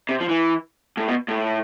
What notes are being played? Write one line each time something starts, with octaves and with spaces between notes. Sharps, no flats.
C3
F3
E3
A2
B2
A2